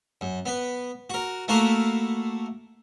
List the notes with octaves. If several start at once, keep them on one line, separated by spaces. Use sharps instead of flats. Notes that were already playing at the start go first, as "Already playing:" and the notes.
F#2
B3 B4
F#4 A#4
A3 A#3 E4 F#4 A#4 F5